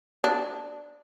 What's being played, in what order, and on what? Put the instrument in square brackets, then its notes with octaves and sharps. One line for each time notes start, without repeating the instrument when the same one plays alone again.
[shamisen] D4